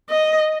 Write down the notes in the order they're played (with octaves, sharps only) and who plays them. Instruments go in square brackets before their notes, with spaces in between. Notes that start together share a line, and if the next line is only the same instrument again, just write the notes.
[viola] D#5